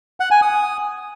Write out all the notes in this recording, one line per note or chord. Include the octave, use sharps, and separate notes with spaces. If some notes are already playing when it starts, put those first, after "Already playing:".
F#5
G#5
D#6